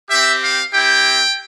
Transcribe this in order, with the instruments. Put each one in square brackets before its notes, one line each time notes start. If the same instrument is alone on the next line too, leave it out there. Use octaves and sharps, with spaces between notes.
[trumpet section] C4 G4 E5
F5
C4 E4 G4 G5